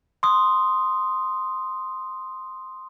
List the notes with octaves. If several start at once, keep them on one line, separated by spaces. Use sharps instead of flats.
C6 D#6